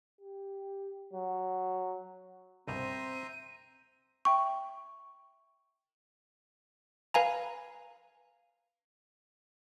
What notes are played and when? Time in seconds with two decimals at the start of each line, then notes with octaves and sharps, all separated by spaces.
0.21 G4
1.14 F#3
2.68 C2 G2 B2 C4 C5 E5 A#5 D#7
4.25 E5 G5 C#6
7.14 B4 F5 G#5 A#5